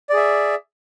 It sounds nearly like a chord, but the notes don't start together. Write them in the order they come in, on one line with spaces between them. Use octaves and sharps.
D5 G#4 E5